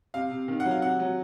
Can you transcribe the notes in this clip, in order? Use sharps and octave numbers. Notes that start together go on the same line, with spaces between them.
C3 F5
C3
D#3
F#5
F#3
F5
C3 F#5
F#3